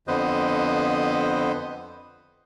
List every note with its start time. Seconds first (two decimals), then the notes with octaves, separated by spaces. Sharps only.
0.08 F2 D3 B3 B4 C5 D#5